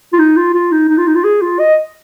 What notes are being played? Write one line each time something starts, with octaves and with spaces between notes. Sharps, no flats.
F4
D#4
F4
F4
D#4
D#4
F4
D#4
F4
G#4
F4
D#5